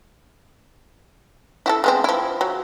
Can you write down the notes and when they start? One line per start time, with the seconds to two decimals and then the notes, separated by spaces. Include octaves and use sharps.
1.66 E4 F#4 A4
1.84 G#3 B3 C4
2.04 F3 E4
2.41 F#3